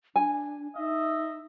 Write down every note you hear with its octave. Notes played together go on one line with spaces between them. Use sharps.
D4 G#5
D#4 D#5 E5